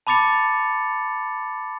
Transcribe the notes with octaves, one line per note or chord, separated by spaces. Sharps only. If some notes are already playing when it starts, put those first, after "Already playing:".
A5 B5 D6 A6 C#7 F7